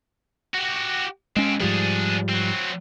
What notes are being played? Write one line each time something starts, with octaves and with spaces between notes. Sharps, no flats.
F#4 G4
F2 G#3 C4 C#4
G#2 F3 G3 D4 G#4
F#3 C4